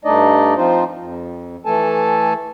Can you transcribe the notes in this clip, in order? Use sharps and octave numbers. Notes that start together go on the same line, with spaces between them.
G2 A3 D4 D#4 D5 D#5
F3 C4 D#4 F4 C5
F2
E3 A3 A4 G#5 A5